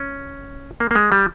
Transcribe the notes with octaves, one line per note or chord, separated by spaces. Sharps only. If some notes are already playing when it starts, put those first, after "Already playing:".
Already playing: C#4
A#3
A#3
G#3
G3